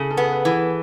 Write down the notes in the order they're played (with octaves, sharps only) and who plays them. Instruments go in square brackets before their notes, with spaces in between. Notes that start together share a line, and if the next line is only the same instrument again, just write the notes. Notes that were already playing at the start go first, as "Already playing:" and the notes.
Already playing: [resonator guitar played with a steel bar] C#3 [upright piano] E4 G#4 A4
[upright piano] A4
[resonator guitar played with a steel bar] B3
[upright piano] B4
[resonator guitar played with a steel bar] E3